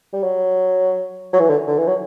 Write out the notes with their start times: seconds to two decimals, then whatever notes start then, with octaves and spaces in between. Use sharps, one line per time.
0.13 G3
0.23 F#3
1.33 F#3
1.39 E3
1.49 D3
1.68 D3
1.78 E3
1.87 F#3